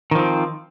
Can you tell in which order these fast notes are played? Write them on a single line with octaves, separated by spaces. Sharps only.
D#3 F3 C4